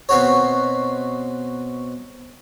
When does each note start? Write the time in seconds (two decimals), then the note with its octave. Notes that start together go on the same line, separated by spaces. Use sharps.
0.09 B2 C4 F#4 C#5